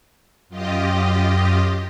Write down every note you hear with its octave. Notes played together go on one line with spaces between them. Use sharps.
F#2 F4 G4 D#5